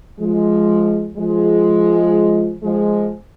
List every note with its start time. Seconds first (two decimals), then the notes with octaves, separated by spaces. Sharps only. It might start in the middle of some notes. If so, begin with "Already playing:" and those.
0.20 F3 G#3
1.18 F3 G#3
2.63 F3 G#3